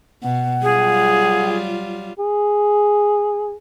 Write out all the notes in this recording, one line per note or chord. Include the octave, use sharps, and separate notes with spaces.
B2 F#5
F#3 G3 F4 G#4
G#4